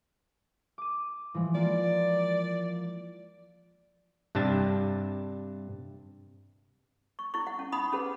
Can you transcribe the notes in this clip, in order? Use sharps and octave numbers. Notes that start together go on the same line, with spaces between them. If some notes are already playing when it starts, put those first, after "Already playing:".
D6 D#7
E3 F3 G#3
A#3 F4 D5
G2 C3 D4 A5
C#6
E4 C#6
F#5
C#4
D#4 F#5 B5 C6 D#6
C#4 G#4 B4 F#5